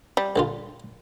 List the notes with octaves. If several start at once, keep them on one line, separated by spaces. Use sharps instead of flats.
G3
A#1 D3 F4